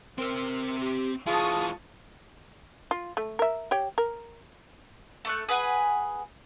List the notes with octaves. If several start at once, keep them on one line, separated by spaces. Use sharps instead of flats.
C4 A#4 E5
G4
E3 G#3 F4 G#4 A5 C#6 D#6
F4
A3
A#4 E5
G4 C#5 G5
A#4
A3 C#6 F#6
G#4 B4 F#5 G#5